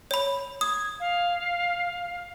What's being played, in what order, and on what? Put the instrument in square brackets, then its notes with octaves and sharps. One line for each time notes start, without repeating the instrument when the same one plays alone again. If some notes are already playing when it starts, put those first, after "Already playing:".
[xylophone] C#5 B5
[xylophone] D#6 [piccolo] G#6
[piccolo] F5